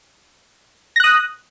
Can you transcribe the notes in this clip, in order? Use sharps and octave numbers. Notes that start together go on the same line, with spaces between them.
D#6 F#6 A#6